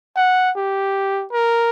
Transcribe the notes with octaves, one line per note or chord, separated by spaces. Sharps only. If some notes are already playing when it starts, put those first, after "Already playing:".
F#5
G4
A#4